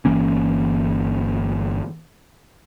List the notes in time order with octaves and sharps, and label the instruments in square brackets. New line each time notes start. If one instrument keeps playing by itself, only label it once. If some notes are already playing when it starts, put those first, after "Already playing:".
[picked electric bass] G1 E3 A#3 C#4